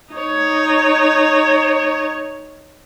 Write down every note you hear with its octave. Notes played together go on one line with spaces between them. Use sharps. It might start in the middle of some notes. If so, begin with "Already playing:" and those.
D#4 C#5